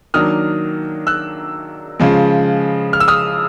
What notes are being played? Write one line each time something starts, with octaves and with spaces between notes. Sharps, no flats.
D#3 F#3 A#3 D4 D#6 F6
E6 F#6
C#3 F3 G#3
F6
E6
D#6 F6